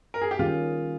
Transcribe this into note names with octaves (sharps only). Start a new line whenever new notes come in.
A#4
G#4
G4
D#3 G3 A#3 C#4 F4 G#4